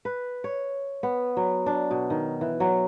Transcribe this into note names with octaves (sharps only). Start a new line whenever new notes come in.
B4
C#5
B3
F#3
D4
B2
D#3
E3
F#3